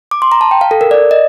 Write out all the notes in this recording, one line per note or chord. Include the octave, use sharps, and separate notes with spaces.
D6
C6
A#5
A5
G5
F5
A4
A#4
D5
D#5